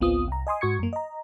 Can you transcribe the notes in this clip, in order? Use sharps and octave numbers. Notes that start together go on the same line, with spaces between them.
G#1 C#2 B3 C4 F4 D#6
C2 A#5
D#5 G#5 C6 D#6
G#2 F#4 C#6 G#6 C#7
F#2 A#3
D#5 A#5